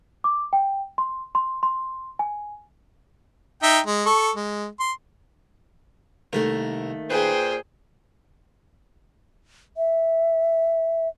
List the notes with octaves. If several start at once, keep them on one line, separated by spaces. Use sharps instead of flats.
D6
G5
C6
C6
C6
G#5
D#4 E5 G5
G#3
A4 C#6
G#3
C6
C2 D#3 A3 A#3 A#4
A#2 G#4 B4 C5 G5
E5